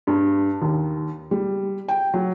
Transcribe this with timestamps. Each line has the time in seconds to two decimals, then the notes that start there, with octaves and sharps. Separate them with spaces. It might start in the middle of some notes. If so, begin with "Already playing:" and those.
0.07 G2
0.62 D#2
1.31 G3
1.88 G5
2.14 F#3